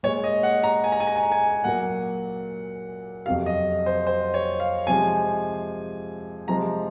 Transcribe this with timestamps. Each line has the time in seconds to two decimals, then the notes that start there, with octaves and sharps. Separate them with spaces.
0.03 A#2 G#3 C#5
0.24 D#5
0.43 F#5
0.64 A#5
0.84 G#5
0.92 A#5
1.00 G#5
1.07 A#5
1.16 G#5
1.23 A#5
1.32 G#5
1.64 A#2 F#3 A#3 F#5
3.26 F2 C3 F#3 F5
3.46 D#5
3.86 C5
4.06 C5
4.34 C#5
4.60 F5
4.87 C3 F3 G#3 G#5
6.48 C3 F3 G#3 A#5